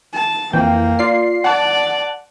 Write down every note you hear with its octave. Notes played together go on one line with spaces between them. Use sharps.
A5
F2 E3 A#3 G5
F4 D5 C7
D5 F#5 A5